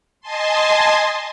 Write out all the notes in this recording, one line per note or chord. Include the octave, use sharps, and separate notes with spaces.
D#5 G#5 A5 C6